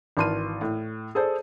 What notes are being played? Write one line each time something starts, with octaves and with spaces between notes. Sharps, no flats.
G#1 E3 A5 C6 F6 D#7
A2
G#4 A4 C5 D5